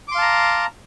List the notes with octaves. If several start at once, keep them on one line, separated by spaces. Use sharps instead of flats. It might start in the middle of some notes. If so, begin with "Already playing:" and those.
F5 A5 A#5 C6 D6